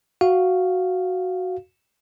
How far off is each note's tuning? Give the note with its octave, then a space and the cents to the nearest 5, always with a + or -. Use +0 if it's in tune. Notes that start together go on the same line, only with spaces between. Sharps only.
F#4 +0 F5 -5